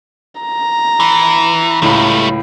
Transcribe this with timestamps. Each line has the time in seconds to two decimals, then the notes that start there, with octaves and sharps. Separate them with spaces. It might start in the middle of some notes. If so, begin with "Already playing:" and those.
0.41 A#5
1.00 E3
1.82 C#2 A2 G3 A3